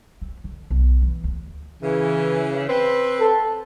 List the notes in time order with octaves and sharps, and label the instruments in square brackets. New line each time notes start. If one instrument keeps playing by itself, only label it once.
[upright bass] C4
D3
B1
E3
D2
[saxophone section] C#3 E3
C4 B4
[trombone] A4